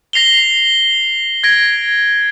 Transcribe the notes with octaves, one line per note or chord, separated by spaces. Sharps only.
A#6 C7 F7 G7
G#6 A#6 D7